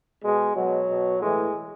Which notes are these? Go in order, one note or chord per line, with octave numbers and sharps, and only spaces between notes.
B2 G#3
B2 F#3
B2
A2 E3 G#3